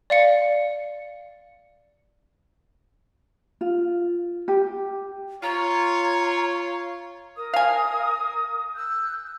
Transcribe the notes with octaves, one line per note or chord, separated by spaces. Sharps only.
D5 F5 C#7
F4
G4
F4 C#5 A#5
A#4 D#6
F5 G#5
E6 F#6 G6